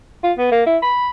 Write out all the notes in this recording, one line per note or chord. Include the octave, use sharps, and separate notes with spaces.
F4
B3
A#3
E4
B5